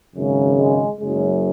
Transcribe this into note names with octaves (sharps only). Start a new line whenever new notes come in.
G#1 F#2 C#3
G#3
F#1 F#2 C#3 F#3 G#3